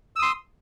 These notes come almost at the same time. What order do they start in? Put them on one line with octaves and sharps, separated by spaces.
E6 D#6 C6